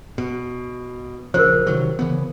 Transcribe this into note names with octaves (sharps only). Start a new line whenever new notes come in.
B2
A#1 C#3 F3 A#4 C5
C3 D#3 F#3
C#3 E3 B3